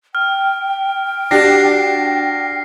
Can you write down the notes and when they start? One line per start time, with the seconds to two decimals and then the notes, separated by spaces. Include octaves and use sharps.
0.15 G5 F6
1.31 D4 F#4 G4 A#6 C7